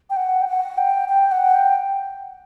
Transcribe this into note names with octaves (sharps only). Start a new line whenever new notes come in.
G5
F#5
G5
F#5
G5
G5
F#5
G5